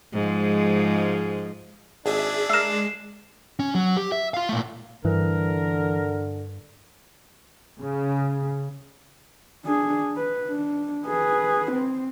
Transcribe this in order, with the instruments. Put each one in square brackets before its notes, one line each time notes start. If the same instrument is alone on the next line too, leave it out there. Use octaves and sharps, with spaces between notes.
[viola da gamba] G#2 F3 G#3
[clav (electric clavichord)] G#1 [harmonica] D4 [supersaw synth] G#4 E5
[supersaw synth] G#3 [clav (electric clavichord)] A#4 E5 [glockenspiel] C7 E7
[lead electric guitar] C#4
F#3
G4
E5
F4 F5
A#2 A3
[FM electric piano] G2 [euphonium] D3 [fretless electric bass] E3 [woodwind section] A#4
[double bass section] C#3
[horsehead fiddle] D4 G#4
B4
D4
G#4 B4
C4